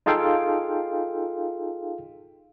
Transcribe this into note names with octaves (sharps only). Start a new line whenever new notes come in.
D#4 F4 G#4 A4 F5 G5